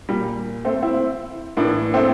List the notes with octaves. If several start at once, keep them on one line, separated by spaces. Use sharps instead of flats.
A#2 G3
A3 C4
C4 E4
A2 E3 A#3 D4
A3 C4